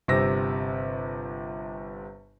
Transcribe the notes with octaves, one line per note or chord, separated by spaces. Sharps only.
G1 C3 C4 G4 E6 A#6